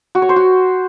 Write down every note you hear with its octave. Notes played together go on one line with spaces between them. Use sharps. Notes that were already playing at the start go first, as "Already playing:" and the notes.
F#4
C#5
C5
F#4